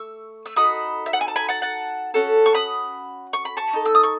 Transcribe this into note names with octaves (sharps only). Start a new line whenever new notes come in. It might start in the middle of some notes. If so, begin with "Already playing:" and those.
Already playing: A3 C#6 E6
E6
D#4 F#4 A4 B5 D#6
E5
F#5
G#5
A5
G#5 B5
F#5 A5
F#5 A5
C#4 F#4 A4
C#6
B5 D#6
C#6
B5
A5 C#6
D#4 A4
E6
D#6
C#6